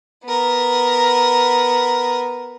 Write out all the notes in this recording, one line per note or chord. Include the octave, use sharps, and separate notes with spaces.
B3 A#4